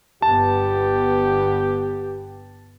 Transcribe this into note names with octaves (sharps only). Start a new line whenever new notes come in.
G1 B3 G4 A5